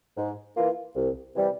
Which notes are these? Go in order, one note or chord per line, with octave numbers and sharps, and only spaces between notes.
G#2
E3 A#3 F4
C2
C3 E3 G3